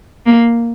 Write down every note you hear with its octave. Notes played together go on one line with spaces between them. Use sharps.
A#3